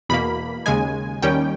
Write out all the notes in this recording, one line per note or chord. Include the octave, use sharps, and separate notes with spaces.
E2 B2 A#3 B5
D#2 C#3 G#3 G#5
D#2 D#3 G3 C#4 G5